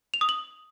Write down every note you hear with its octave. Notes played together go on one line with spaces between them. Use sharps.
F7
D#6
F#7